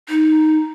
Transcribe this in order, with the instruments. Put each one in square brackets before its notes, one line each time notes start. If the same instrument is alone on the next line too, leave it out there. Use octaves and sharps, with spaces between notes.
[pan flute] D#4